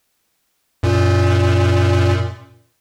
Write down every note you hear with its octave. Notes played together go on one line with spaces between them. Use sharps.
F#2 A#2